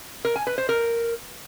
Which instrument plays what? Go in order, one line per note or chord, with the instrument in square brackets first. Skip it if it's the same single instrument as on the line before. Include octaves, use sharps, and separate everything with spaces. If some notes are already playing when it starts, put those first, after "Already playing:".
[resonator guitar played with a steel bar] A#4
G#5
B4
C5
A#4